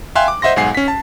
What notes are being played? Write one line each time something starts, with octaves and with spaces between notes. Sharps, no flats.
E5 F5 G5 G#5 C6 F#6
D6
C5 D#5 E5 F#5 C6 A#6
B1 G#2 F#5 G#5 C7
C#4 B6
A5